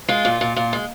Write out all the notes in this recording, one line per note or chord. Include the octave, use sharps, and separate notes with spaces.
G#3 F4
A#2
A#2
A#2
G#3